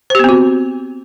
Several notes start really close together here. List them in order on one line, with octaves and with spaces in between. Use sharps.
C5 G4 B3 C4 F#4